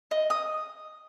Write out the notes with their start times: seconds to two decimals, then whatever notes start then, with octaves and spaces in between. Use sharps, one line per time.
0.11 D#5
0.30 D#6